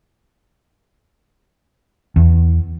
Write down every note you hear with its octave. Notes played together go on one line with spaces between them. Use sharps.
E2